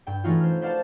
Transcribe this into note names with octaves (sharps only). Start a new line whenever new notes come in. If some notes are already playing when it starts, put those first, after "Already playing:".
G2 G5
E3 A3 C#4 D#4 F4 F#4
C5 F6
B4 C5 D5 F5 F#5 A5